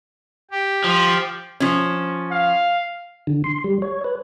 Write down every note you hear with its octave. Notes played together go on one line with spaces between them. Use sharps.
G4
F3
F3 C#4
F5
D3
C6
G3
C#5
B4